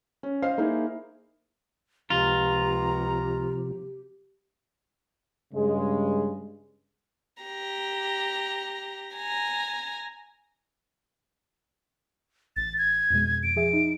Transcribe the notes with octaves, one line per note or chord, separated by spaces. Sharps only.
C#4
C5 D#5 F5 F6 C7
A#3 D#4 E4 G#4 C5
C#2 C3 F3 F4 G4 A#5
G2 C#3 G#3
G4 A#5
G#5 A#5
A1 A6
G#6
F2 B2 G#3
F2 D7
F3 G#4 E5
D#4